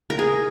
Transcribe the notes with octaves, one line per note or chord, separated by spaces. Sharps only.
A#4
G#4